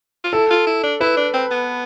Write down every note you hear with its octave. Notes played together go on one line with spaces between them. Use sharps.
F4
E4 A4
F4
E4
D4
E4 B4
D4
C4
B3